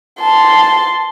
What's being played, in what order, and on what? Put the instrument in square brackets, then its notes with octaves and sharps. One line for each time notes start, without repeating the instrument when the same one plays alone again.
[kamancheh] A5 C6